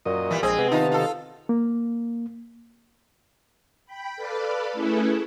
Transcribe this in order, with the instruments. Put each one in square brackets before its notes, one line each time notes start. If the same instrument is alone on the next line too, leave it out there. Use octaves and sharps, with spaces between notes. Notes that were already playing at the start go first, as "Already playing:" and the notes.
[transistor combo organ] F#2 D#5 [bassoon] A#2
[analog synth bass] E3 [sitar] G3 B3
[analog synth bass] A#1 [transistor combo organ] G#3 G#4 D#5 [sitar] C4
[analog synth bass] C3 [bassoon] B3
[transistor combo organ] D#3 A5 [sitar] D#4 F4
[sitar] F4 A4
[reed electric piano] A#3
[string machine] G5 B5
A4 B4 D5 F5 B5
A3 C#4 E4 G#4 A4 B4